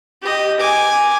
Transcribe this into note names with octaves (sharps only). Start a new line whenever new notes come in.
G4 D#5
G#5 D6